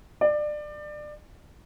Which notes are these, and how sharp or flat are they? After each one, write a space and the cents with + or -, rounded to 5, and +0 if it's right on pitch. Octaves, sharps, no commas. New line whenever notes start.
D5 +25